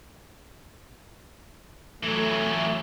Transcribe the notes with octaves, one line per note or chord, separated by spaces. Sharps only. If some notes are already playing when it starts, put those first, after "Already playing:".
E3 F#3 A3